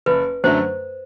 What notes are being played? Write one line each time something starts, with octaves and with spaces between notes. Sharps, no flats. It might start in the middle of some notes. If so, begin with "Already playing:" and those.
F#1 B4
F#2 D3 F#3 A3 C5